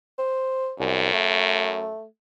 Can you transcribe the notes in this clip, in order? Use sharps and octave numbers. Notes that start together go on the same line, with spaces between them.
C5
C2 F#2
A3